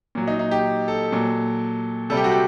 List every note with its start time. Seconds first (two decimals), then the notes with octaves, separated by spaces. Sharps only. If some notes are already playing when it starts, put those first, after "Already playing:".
0.15 A#2 F#3
0.27 D#4
0.39 D#4
0.51 G4
0.88 A4
1.12 A#2 F#3
2.10 C3 G3 A4
2.17 G4
2.24 F#4
2.32 G4